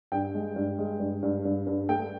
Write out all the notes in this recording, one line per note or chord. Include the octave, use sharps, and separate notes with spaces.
G2 G5
G#3
G2
G#3
G2
G2
G2
G2
A3 G5